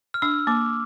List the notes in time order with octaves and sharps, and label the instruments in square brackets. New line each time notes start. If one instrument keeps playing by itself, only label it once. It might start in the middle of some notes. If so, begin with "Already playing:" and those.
[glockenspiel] F6
[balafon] D4 [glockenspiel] E6
[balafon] A#3 [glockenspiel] D6